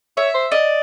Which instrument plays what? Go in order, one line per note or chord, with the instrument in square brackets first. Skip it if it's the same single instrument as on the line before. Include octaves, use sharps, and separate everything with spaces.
[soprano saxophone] C#5 [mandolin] E5
[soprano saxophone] C5
[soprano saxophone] D5 [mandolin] D#5